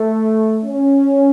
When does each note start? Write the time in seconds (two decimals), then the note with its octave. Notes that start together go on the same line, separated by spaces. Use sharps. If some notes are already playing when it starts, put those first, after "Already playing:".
Already playing: A3
0.65 C#4